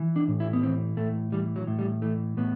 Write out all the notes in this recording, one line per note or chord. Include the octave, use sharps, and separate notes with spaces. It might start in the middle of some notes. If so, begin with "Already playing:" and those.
Already playing: E3
D4
A2
E4
B3
E3 C4
A2 A3
E3 G3
F#3
A2
G3
E3 A3
A2 B3